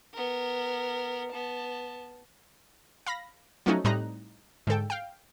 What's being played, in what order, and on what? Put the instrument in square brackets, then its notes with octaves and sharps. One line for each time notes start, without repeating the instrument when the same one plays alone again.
[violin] B3 A#4
B3 A5
[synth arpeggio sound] F5 B5 A#6
F3 F#3 A3 C#4 D#4 F#4
A2 G3 C4 D#4 A#5 F#6
G#2 D3 A4 G5
F5 G5